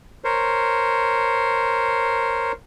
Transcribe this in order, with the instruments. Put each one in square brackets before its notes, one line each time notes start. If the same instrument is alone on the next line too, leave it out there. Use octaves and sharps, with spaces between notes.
[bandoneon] A#4 C5 C#5